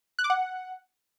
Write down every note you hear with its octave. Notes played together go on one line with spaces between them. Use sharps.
F#6
D6
F#5